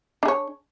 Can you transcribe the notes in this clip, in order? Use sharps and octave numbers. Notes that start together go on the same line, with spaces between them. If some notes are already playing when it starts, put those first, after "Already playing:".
D4 G#4 C#5